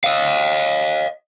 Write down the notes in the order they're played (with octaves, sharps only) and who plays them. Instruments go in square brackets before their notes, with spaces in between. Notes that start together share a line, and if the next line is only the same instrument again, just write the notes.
[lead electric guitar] D#5 F5